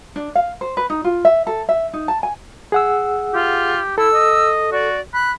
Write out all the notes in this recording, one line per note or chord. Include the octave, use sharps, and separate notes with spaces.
D4
F5
C5
B4
D#4
F4
E5
A4
E5
D#4
A5
G#5
G#4 F#5 E6
F4 G4
E4 A4 E6
D#5
F#4 D5
B5 F#6